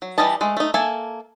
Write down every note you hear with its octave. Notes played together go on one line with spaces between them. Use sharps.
F#3
E3 G3 B4 D#5 A5
G#3 A3
A3 D#4
A#3 A4 E5 G#5